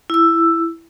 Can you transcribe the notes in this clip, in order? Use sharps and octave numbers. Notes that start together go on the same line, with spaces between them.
E4 E6